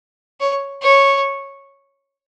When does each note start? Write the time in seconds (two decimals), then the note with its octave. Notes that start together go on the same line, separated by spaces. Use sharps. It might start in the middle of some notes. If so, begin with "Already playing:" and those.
0.41 C#5
0.82 C#5